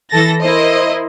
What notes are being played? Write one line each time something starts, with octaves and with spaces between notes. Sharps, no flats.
E3 A4 A6 A#6
E4 A#4 C5 D#5